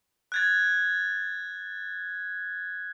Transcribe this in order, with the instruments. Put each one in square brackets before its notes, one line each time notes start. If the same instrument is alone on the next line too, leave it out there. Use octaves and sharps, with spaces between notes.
[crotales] F#6 G#6 A6